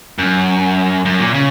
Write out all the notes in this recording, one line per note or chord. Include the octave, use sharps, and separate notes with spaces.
F#2
F#2
A#2
C#3